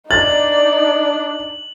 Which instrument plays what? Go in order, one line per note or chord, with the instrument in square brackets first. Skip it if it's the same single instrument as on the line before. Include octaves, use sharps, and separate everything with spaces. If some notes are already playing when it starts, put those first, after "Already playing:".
[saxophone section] D4 [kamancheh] D#4 D5 [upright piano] A6 [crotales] F#7